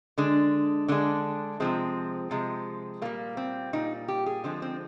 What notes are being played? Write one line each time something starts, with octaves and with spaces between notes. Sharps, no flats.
D3 G#3 D4
D3 G#3 D4
C3 F3 G#3 C4
C3 F3 G#3
A#2 G3 A#3
C4
A#2 G3 D#4
G4
G#4
D3 F3 G#3 C4
C4